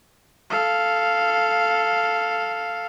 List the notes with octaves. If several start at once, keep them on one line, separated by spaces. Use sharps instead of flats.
A4 F5